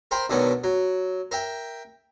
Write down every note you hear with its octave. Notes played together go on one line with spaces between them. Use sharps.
A#4 C5 G5 B5
B1 D3 D#3 F#3 B3
F#3
A#4 E5 G5